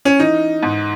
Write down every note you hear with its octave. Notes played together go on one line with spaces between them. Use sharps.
C#4
E3 D#4
G#2